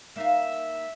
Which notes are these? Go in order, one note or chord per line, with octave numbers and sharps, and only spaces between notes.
A#3 D#4 E5 F5